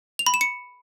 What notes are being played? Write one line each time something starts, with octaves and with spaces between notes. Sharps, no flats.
F7
B5
E7
C#7